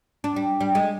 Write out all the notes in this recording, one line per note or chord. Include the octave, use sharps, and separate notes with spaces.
D4
G3
G3
G#3